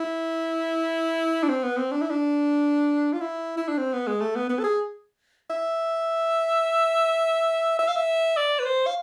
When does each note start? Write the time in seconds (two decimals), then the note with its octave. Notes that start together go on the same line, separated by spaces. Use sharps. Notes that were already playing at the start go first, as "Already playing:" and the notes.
Already playing: E4
1.43 D4
1.49 C4
1.63 B3
1.77 C4
1.92 D4
2.02 E4
2.10 D4
3.13 F4
3.21 E4
3.57 E4
3.68 D4
3.78 C4
3.93 B3
4.07 G#3
4.21 A3
4.35 B3
4.49 B3
4.60 A4
4.64 G#4
5.50 E5
7.79 E5
7.88 F5
7.96 E5
8.37 D5
8.59 B4
8.65 C5
8.87 F5